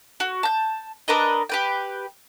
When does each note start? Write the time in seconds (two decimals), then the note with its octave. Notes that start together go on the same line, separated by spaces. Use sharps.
0.20 F#4
0.43 A5 G6
1.08 D4 A#4 B4 D#5
1.49 G4 B4 G5